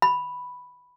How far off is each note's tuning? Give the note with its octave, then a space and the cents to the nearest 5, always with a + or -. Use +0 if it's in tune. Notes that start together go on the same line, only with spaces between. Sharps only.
B5 +0